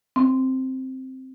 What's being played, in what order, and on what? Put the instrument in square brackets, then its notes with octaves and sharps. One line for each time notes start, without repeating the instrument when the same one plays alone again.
[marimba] C4